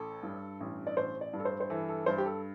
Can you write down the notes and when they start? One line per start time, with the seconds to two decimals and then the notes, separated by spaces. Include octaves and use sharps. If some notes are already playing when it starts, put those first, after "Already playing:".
Already playing: A1 A4
0.23 G2
0.60 A1
0.87 D5
0.97 A1 C5
1.21 D5
1.33 G2
1.40 A4
1.45 C5
1.60 C5
1.70 E3 A4
1.89 A4
2.06 G2 C5
2.18 G4
2.26 A4